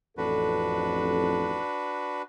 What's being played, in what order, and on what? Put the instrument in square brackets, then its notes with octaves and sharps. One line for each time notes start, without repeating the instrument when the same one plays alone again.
[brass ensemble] A1 F2 A4 [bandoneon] D4 F#4 B4